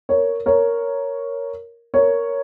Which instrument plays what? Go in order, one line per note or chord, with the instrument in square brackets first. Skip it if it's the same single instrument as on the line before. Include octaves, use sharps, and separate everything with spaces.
[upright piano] A#4 C#5
A#4 C#5
A#4 C#5